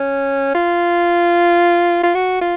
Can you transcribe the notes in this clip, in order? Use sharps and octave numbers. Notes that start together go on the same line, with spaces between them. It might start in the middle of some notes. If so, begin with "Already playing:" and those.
Already playing: C#4
F4
F4
F#4
F4